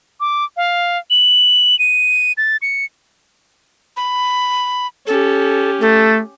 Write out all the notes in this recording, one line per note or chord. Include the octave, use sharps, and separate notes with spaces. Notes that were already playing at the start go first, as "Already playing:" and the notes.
D6
F5
F#7
D#7
A6
C#7
B5
C#4 G4 A4
A3 A4